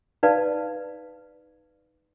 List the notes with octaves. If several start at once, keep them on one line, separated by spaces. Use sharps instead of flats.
D#4 B4 D5 F5 A5